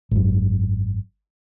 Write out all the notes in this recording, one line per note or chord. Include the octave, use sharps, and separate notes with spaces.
G#1 F#2